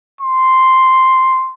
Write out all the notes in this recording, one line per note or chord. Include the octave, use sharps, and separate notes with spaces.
C6